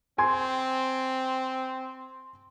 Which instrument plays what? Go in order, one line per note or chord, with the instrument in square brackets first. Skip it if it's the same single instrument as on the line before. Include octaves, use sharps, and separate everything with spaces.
[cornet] C4 [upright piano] G#5 C6 G#6